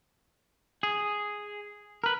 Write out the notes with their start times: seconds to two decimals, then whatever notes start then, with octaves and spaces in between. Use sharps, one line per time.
0.83 G#4
2.04 A#4 B4